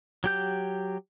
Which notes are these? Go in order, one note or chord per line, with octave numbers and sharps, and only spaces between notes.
F#3 G4 G6